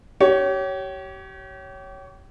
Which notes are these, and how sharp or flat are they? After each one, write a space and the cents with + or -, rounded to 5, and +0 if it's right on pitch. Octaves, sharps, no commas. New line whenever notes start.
G4 -35 C#5 +5